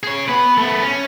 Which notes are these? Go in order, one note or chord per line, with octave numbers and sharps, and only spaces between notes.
G#4 C#5
B3 B4
A3 B3
C#4